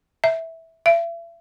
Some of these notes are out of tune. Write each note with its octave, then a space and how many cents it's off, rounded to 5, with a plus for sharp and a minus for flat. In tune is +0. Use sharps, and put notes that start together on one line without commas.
E5 -10
E5 +40